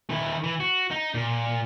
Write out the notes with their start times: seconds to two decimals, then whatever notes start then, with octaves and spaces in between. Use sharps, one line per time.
0.10 D#3 E4
0.44 E3
0.60 F#4
0.91 D#4
1.15 A#2